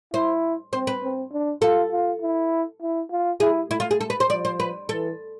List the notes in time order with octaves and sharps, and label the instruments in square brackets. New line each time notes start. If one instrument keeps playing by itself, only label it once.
[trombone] E4 [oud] C5
[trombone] C4 [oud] C5
[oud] B4
[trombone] C4
D4
[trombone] F4 [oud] A4
[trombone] F4
E4
E4
F4
[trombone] E4 [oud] G#4
[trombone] A3 [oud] E4
[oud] F4
G#4
A4
B4
C5
[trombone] F3 [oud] D5
[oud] C5
B4
[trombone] E3 [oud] A4